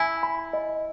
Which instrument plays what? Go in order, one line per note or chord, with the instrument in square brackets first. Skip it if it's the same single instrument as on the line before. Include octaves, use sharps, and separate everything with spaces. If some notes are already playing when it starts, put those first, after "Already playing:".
Already playing: [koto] E4 [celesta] G#5
[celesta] B5
D#5